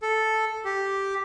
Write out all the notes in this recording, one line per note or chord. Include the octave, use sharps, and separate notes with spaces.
A4
G4